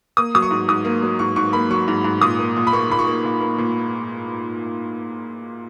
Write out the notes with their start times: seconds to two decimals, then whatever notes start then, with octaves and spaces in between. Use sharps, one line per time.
0.17 A#3 D#6
0.35 F#3 D#6
0.42 C#6
0.51 G#2
0.68 G#2 D#6
0.85 A#3
1.03 F#3
1.19 G#2 C#6
1.36 G#2 C#6
1.53 A#3 B5
1.70 F#3 C#6
1.88 G#2
2.04 G#2
2.21 A#2 D#6
2.39 A#3
2.56 A#2
2.67 B5
2.72 A#3 C#6
2.90 A#2 B5
2.99 C#6
3.07 A#3
3.24 A#2
3.41 A#3
3.58 A#2